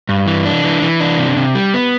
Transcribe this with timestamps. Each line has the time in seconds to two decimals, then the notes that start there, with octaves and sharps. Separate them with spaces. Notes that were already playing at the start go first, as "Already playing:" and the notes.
0.09 G2
0.27 E3
0.45 D4
0.64 E3
0.82 E3
1.00 D4
1.18 C3
1.37 C3
1.55 G3
1.74 B3